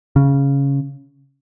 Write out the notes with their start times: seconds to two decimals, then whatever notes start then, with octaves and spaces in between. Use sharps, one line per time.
0.16 C#3